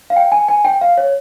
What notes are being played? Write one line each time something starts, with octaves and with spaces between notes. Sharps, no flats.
F5
G5
G#5
G#5
G5
F5
C#5